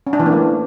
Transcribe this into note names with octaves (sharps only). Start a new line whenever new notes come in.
C#4
D4
E3
A#3
A3